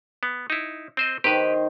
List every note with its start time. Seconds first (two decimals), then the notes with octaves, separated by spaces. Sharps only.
0.23 B3
0.50 D#4 E4
0.97 C4 C5 D#5
1.24 D#3 G4 B4 C5